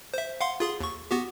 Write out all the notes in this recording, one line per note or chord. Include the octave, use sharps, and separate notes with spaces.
C5 E5
F5 F#5 C6
F4 G#4 C6
D#2 C#6
B3 F#4 G4